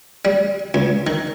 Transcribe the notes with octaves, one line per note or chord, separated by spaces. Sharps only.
G3
C#2
D#3